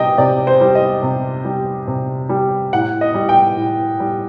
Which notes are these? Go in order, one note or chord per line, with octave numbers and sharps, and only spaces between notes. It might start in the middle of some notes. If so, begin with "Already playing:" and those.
Already playing: C3 G3 D#5 G5
C3 D5
C5
G3
D#5
C3
G3
C3
G3
A2 F#5
D#5
G3
G5
A2
G3